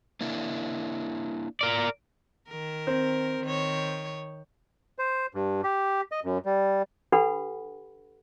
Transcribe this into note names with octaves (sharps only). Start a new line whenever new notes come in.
A#3 D4 E4
A#4 D5
D#3 A#4
C4
D#3 C#5
C5
G2
G4
D#5
F#2
G3
D4 G4 A4 B4 F#5 B5